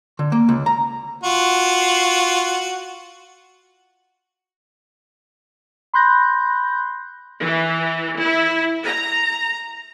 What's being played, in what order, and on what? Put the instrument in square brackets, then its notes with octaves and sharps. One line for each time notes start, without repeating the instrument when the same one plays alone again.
[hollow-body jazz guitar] D3
A#3
C#2
A#5
[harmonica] F4 F#4
[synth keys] B5 C6 F#6 G6 A#6
[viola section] E3
E4
A#5